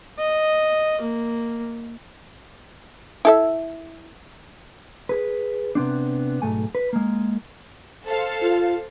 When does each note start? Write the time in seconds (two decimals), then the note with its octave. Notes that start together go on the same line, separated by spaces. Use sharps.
0.19 D#5
1.02 A#3
3.25 E4 A4 E5
5.09 G#4 B4
5.75 C3 B3 C4 D4
6.42 B1 G#2 A3 G#5
6.75 B4
6.93 G#3 A#3
8.05 A4 C5 F5
8.42 F4